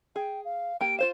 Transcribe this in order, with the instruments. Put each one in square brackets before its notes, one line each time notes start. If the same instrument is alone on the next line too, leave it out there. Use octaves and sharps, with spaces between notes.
[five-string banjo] G#4 [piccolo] G5
[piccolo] F5
[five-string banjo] A#3 G4 [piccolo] D7
[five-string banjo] F4 C5 F5 [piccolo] E7